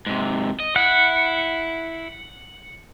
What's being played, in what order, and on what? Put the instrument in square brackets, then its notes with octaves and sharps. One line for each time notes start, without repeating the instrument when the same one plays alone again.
[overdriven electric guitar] G#2 C3
D#5
[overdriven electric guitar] E4 [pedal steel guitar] F#5